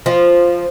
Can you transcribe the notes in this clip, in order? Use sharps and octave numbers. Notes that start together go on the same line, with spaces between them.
F3